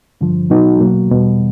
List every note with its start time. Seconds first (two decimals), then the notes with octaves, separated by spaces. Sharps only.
0.21 G2 D3 F3
0.50 B2 F#3 B3 D#4 F#4
0.80 B2 F#3 A#3
1.10 E2 B2 G3